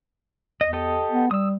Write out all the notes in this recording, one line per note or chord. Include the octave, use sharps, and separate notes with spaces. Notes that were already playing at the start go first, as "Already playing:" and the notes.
E2 D#5
G4 A4 D#5
B3
G3 D#6 E6